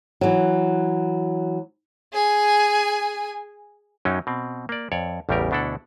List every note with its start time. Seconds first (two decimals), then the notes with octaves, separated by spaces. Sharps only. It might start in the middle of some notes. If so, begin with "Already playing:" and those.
0.21 E3 F#3
2.13 G#4 G#5
4.05 F#2 F#3 C#4 D#4 G5
4.27 B2 C4
4.69 A#3 D5
4.92 F2 C#5 D5
5.29 A1 E2 C#3 G3 G4 A#4
5.51 D2 B2 D4 E4 A4 F#5